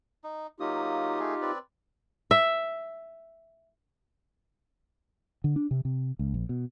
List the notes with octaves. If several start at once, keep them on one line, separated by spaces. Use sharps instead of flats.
D#4
F#3 A#3 D#4 F4 G4 D#6
A3 G#4
C4 B4 D5
E5
D3
D4
C3
C3
C#2
A#1
B2